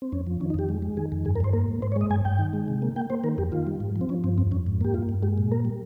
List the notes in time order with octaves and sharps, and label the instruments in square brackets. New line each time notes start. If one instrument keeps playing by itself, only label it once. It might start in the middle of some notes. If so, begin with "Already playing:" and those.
[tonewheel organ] C4
F2 C#4
F3
D#3 C#4
D#4
F2 G4
G#3
G#3
D#3 G#4
F2
G2 G#4
A#4
G2 C5
A#3 A#4
G#2
G#2 C5
C#5
G#3
D#5
G2 G#5
G2 G5
D#3
G#3
C3
A#3
A#3 G5
A#3 C5
D#3 A#4
F2 G4
D#3 F4
G3
G#2
F3
C4
F3 C#4
G2 C4
F2 C4
F2 C#4
G#2
A#3 G4
G2 F4
G2
G#3 G4
A#2
A#3 A#4
G3